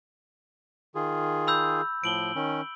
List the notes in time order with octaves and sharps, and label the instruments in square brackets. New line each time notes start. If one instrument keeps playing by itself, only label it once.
[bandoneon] D#3 F4 G#4
[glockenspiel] B5 E6 G6
[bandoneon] A2 F3 [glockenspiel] D7 F#7 G7
[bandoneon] D#3 C#4